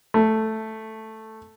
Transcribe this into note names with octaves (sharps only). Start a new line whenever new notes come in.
A3